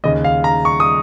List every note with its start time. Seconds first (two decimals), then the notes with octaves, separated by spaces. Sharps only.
0.04 D#2 C#3 D#5
0.24 F5
0.44 A#5
0.65 C#6
0.80 D#6